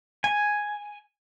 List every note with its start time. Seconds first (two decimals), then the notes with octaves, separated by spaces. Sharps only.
0.24 G#5